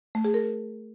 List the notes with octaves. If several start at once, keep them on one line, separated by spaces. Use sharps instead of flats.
A3
G#4
A#4